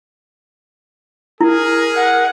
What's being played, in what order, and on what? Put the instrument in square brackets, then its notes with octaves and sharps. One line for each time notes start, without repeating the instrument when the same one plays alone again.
[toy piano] E4 [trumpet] G#4 [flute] A#4
[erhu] F#5